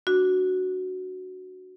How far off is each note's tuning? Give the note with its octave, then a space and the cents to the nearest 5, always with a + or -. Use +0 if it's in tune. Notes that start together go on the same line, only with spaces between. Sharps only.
D4 +0 F#4 +0